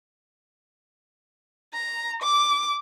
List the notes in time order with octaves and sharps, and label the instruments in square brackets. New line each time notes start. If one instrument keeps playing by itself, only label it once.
[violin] A#5
D6